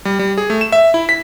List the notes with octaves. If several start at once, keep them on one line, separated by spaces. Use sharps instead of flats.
G3
G3
G#4
A3
E7
E5
E4
B6